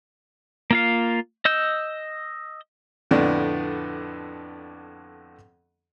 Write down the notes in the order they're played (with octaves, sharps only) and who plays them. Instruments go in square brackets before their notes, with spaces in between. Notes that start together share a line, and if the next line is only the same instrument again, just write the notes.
[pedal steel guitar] A#3 F4 F5
D#5 E6 G6
[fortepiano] F2 A2 D3 B3 D4